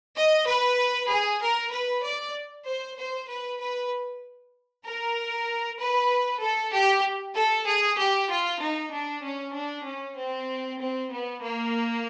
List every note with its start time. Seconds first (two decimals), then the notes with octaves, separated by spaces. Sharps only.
0.16 D#5
0.46 B4
1.09 G#4
1.40 A#4
1.72 B4
2.03 D5
2.66 C5
2.97 C5
3.28 B4
3.60 B4
4.86 A#4
5.79 B4
6.41 A4
6.73 G4
7.36 A4
7.67 G#4
7.99 G4
8.30 F4
8.61 D#4
8.92 D4
9.24 C#4
9.54 D4
9.86 C#4
10.17 C4
10.80 C4
11.12 B3
11.42 A#3